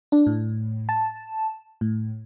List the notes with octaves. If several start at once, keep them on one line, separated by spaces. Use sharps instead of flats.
D4
A2
A5
A2